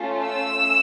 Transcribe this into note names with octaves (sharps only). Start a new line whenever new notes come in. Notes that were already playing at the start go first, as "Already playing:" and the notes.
Already playing: A3 C#4 F4
E6